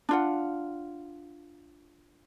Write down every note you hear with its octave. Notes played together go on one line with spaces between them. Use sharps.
D4 F4 F#5